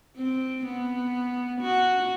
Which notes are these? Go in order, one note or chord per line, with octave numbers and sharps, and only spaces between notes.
C4
B3
F#4